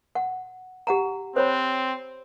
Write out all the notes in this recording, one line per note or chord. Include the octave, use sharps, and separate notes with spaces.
F#5
G4 F#5 A#5
C4 C5 C#5 B5